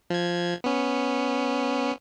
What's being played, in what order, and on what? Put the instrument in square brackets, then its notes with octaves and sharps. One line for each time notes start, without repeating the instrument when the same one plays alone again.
[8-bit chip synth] F3 G#6
B3 C#4